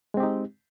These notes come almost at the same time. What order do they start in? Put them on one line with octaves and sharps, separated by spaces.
G#3 C4 G4 D#4